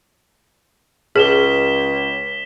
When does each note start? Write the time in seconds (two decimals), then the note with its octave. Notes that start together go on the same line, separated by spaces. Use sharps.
1.16 C#2 G#4 B6 E7 G7